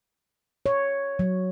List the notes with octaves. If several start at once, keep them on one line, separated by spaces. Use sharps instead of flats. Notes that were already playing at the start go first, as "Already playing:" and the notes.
C#5
F#3